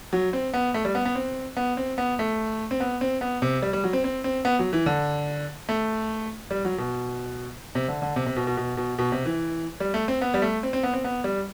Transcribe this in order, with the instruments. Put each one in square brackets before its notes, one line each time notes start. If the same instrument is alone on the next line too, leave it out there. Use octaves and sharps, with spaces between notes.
[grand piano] F#3
C4
B3
A3
G3
B3
B3
C4
B3
C4
B3
A3
C4
B3
C4
B3
C3
G3
G3
F#3
C4
C4
C4
B3
F#3
E3
D3
A3
G3
F#3
B2
C3
D3
D3
C3
C3
B2
B2
B2
B2
B2
C3
E3
G3
A3
C4
B3
G3
A3
C4
C4
B3
C4
B3
G3